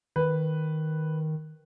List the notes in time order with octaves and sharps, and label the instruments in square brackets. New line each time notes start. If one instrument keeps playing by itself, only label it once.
[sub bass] D#3 [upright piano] B4